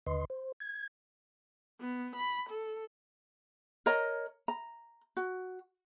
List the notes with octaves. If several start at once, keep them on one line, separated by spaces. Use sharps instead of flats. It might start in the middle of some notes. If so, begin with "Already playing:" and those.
D#2 D3 B4 D#5 C6
C5
G#6
B3
B5
A4
A#4 C#5 D#5 A#5
A#5
F#4